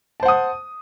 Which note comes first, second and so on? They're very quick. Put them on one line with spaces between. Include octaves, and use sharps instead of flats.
A5 C5 F#5 D#6